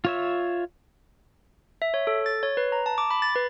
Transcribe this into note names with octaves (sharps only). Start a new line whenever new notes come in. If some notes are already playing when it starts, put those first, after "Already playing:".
F4 C#5 E5
E5
C#5
A4
A6
C#5
B4
A#5
A5
D6
B5
A6
B4